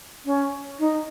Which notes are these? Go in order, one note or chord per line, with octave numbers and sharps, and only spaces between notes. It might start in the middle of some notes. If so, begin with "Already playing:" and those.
C#4
D#4